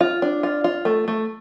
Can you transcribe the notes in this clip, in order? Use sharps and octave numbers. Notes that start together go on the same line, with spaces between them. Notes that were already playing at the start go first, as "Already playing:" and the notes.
F4
D4
F4
F4
A3
A3